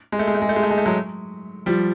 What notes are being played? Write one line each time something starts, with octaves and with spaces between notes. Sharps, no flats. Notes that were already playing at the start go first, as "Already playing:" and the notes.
G#3
A3
G#3
A3
G#3
A3
G#3
A3
G#3
A3
F#3 G#3
F3 G3